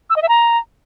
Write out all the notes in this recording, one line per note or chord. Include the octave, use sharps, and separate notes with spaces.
E6
D#5
E5
A#5